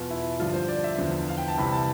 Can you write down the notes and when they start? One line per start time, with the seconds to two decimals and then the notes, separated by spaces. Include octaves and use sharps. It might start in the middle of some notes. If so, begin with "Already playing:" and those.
Already playing: E2 B2 F4
0.10 E4
0.39 G2 D3 F3 F4
0.54 C5
0.69 D5
0.84 E5
0.99 E2 D3 F3
1.29 F5
1.37 G5
1.48 A5
1.57 C2 C3 E3 B5
1.73 A5